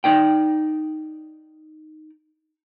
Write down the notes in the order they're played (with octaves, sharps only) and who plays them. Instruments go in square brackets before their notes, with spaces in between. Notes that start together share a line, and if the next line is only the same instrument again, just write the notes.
[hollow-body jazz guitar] D#4 D5 G5